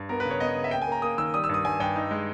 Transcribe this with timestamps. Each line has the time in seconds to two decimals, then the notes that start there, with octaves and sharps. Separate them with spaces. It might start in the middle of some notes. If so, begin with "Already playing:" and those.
Already playing: G2
0.09 B3 A#4
0.20 B4
0.25 C#3
0.30 C#5
0.40 B3 D#5
0.56 C#3
0.64 E5
0.71 A#3 G5
0.82 G#5
0.87 A#3
0.92 A#5
1.02 A#3 D#6
1.18 D#3 E6
1.34 G3 D#6
1.44 E6
1.49 G2 D#6
1.65 G2 G#5
1.80 G2 G5
1.96 D#4
2.11 G#3